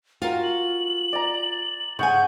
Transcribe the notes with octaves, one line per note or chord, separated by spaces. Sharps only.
F4 F#4 A#4 G5
F#7
D5 A#5
C#3 F#5 G#5 C#6 G6